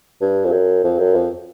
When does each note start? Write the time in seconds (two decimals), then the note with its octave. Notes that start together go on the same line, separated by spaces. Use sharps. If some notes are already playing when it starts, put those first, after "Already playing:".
0.21 G2
0.45 F2
0.52 F#2
0.84 F2
0.99 F#2
1.15 F2